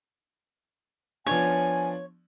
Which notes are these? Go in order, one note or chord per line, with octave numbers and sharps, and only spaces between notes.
F3 B3 D4 C#5 G#5